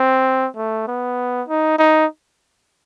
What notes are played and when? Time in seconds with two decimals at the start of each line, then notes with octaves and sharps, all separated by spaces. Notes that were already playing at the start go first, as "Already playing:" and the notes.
Already playing: C4
0.56 A3
0.88 B3
1.48 D#4
1.78 D#4